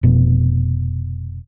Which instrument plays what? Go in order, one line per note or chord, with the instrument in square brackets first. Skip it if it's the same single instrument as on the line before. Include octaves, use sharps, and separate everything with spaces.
[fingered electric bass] F1 B2